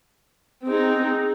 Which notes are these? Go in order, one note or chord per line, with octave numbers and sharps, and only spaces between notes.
C4 D#4 G#4